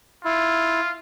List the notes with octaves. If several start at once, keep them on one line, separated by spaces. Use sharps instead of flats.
E4 F4